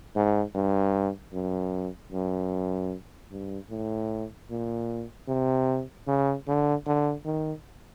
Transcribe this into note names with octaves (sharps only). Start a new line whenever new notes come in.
G#2
G2
F#2
F#2
G2
A2
A#2
C3
C#3
D3
D3
D#3